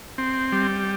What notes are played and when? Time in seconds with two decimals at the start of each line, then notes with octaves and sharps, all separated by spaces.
0.18 C4
0.52 G3